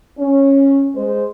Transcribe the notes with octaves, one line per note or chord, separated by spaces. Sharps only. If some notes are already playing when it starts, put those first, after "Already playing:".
C#4
G#3 G#4 C5